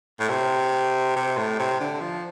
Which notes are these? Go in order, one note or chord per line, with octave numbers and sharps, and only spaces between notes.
A2
C3
C3
A2
C3
D3
F3